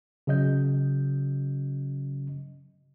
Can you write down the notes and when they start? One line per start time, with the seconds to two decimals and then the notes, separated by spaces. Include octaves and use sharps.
0.27 C#3 F#3 D#5 G6